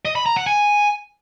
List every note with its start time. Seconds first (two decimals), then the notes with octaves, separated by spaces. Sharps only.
0.05 D#5
0.16 B5
0.26 A#5
0.36 F#5
0.46 G#5